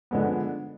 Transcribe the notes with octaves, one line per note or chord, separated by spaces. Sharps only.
D3 F3 G#3 B3